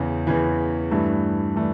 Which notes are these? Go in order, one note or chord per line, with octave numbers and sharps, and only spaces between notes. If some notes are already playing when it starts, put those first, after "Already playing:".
Already playing: E2 C#3 E3
E2 C#3 E3
G2 E3 A3 D4
E3 A3 D4